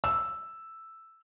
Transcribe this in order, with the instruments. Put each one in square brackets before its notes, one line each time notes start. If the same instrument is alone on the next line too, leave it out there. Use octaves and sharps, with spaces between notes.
[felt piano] E6